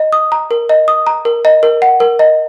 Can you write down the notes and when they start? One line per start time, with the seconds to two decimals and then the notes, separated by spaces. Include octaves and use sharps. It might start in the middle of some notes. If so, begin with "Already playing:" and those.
Already playing: D#5
0.13 D#6
0.32 A#5
0.51 A#4
0.69 D#5
0.88 D#6
1.07 A#5
1.25 A#4
1.45 D#5
1.63 A#4
1.82 F#5
2.00 A#4
2.19 D#5